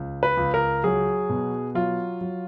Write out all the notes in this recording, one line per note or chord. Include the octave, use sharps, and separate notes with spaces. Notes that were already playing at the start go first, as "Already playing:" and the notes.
Already playing: C#2
B4
C#2
A#4
F#3 G#4
B2
F#3 F4
F#3